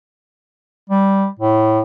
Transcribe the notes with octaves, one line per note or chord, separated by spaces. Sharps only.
G3
A2